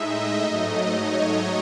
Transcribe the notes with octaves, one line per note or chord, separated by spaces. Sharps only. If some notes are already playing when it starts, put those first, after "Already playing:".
Already playing: A2 G#3 D#4 D#5 E5
G#2 F#3 A3 D#4 D#5
C#5